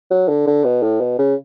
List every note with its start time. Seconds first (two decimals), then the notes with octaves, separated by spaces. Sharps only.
0.11 F#3
0.28 D3
0.47 D3
0.64 B2
0.82 A2
1.00 B2
1.19 C#3